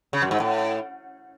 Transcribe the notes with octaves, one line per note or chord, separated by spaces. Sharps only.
C#3
F#2
G#2
A2